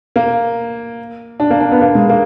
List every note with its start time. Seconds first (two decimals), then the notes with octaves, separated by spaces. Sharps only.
0.16 A#3
1.40 D4
1.50 A#3
1.61 D4
1.72 B3
1.81 A#3
1.95 G#3
2.09 A#3